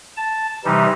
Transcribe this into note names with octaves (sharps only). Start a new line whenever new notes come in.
A5
C3 E3 G3 D#4